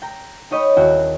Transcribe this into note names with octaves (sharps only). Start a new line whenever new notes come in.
G5 A#5
D#4 G4 C#5 D#5 G5 B5
D#1 E4 F#4 G5